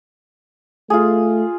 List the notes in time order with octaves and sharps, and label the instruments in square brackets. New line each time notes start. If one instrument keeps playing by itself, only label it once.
[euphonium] A3 [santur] F4 G#4